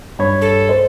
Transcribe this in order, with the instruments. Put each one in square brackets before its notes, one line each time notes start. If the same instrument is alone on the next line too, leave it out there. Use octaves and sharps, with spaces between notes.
[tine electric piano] G2 C#5 [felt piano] B5
[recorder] A4
[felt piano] C5